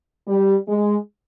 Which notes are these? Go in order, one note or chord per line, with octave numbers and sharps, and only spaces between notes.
G3
G#3